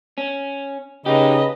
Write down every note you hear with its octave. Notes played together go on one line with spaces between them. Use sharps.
C#4
C#3 D#4 G4 B4 D#5